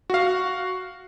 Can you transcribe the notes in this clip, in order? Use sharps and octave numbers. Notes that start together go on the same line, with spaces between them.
F#4 F5